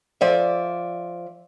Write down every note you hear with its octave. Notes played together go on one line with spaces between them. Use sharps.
F3 D5 E5